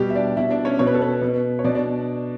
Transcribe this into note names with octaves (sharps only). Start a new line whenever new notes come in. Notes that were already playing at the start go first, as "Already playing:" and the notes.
Already playing: B2 G3 G4
E5
D4 D5
B2 E4 E5
D4 D5
C#4 C#5
B2 C#5
B4
A4
B3 B4
B2
C#5
B2 D4 D5
D4 D5